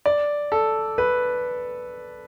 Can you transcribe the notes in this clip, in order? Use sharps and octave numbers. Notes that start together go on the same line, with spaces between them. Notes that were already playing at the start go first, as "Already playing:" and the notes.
D5
A4
B4